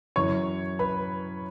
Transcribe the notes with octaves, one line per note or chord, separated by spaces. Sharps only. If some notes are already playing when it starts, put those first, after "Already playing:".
F#2 E3 C#5 C#6
B4 B5